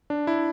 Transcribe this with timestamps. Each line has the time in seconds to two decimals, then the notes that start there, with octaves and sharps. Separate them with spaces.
0.10 D4
0.27 E4